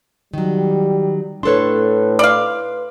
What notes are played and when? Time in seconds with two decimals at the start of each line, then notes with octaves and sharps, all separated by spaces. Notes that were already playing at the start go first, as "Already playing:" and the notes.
0.33 D#3 F#3 G3
1.43 A2 D4 A4 B4 C#5 C6
2.19 D5 F5